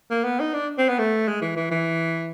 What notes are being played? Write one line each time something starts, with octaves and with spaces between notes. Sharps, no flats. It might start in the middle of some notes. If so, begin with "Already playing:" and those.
A#3
B3
D#4
D4
C4
B3
A3
G#3
E3
E3
E3